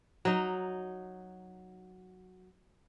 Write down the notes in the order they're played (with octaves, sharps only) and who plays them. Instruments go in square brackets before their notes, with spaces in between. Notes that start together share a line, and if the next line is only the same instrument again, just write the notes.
[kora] F#3 D#4